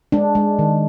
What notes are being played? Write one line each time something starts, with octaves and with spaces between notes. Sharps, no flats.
G#3 D4
G#3
D#3